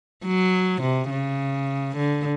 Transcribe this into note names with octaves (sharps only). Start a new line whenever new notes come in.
F#3
C3
C#3
D3